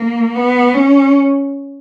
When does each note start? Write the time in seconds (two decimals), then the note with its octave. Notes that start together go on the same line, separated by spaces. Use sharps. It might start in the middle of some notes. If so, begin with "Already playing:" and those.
Already playing: A#3
0.35 B3
0.74 C#4